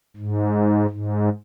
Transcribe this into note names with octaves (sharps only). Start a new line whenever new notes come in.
G#2
G#2